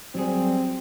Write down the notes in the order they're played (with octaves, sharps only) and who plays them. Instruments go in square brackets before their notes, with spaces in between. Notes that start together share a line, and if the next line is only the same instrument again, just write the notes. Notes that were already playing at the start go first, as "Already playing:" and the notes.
[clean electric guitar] F#3 G3 G#4 [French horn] C4